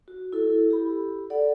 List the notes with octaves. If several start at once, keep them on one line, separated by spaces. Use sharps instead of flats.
F#4
E4 A4
G4 B5
A4 D5 F#5